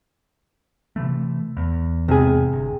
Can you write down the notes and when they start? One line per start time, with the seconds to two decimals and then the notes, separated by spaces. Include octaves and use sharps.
0.96 C3 E3 A3
1.57 E2
2.08 E2 G#2 C3 G#4
2.53 G1